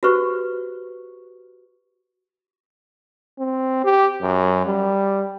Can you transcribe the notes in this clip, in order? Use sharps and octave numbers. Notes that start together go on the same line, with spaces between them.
F#4 G4 B4 C5 C#6
C4
G4
F#2
G3